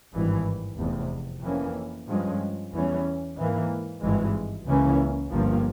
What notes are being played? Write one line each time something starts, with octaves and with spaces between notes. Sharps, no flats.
G#1 G2 E3
F1 E2 C3
F2 E3 A#3 C#4
G2 F3 G#3 C#4
E2 E3 G3 C#4
G#2 E3 A#3
G#1 G2 E3 G#3
C#2 C#3 E3 A#3 C#4
G1 G2 F3 A#3